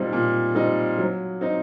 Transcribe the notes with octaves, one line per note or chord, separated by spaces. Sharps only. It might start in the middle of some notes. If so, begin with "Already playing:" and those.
Already playing: A#2 G3 C4 D#4
A#2
G3 C4 D#4
F#3
C4 D#4